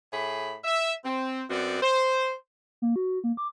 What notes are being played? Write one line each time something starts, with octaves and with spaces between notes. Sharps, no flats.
A2 G#4 B5
E5
C4
F#2 B3 C4 F#4 D5
C5
A#3
F#4
A#3
D6